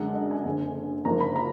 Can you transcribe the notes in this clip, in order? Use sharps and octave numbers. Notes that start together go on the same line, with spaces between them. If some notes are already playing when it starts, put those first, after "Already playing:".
Already playing: F#2 D3 G#3 D4 F#5
D#5
G#5
F#1 F2 D3
F#1 F#2 F3 A#3 D#4 A#5
B5
A#5